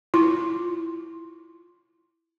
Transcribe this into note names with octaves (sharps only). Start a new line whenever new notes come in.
E4 F4 C6